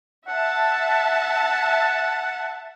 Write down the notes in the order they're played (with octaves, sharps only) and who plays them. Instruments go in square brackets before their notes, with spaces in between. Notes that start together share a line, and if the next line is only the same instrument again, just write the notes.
[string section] E5 A5 [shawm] F#5